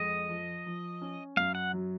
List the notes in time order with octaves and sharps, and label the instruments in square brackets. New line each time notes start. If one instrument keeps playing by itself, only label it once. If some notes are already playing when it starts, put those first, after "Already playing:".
Already playing: [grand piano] F2 G#3 [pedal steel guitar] D#5
[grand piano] F3
F3
C#4
[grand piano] F#2 [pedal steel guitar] F5
[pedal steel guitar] F#5
[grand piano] F#3